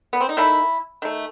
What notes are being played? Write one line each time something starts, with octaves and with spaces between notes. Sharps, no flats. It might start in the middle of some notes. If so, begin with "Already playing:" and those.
B3
C4
D#4
D#3 A3 E4
D#3 A3